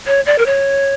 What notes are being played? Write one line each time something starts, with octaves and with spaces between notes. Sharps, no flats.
C#5
D5
A#4
C#5